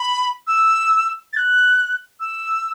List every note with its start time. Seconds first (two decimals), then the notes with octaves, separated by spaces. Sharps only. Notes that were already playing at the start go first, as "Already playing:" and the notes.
Already playing: B5
0.47 E6
1.33 A6
1.37 F#6
2.20 E6